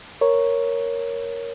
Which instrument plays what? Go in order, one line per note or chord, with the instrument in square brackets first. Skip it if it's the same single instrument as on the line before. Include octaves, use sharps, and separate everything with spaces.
[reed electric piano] A#4 C#5